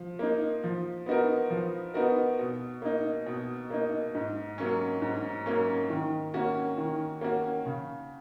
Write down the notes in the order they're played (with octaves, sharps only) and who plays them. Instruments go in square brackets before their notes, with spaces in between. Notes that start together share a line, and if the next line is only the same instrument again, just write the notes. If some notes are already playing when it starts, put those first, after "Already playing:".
Already playing: [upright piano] F3
A#3 D#4
F3
B3 D#4 F#4 A#4
F3
B3 D#4 F#4 A#4
B2
A#3 D#4
B2
A#3 D#4
G#2
F#3 A#3 C#4
G#2
F#3 A#3 C#4
D#3
A#3 C#4 F#4
D#3
A#3 C#4 F#4
C#3